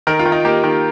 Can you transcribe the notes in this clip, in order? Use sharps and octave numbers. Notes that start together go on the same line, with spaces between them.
D#3 A#4
F4
D#3
D#4
A#3 G4
D#3